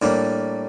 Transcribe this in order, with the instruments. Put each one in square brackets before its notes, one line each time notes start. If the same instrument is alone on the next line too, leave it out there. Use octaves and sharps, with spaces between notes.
[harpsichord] A2 G3 A#3 D4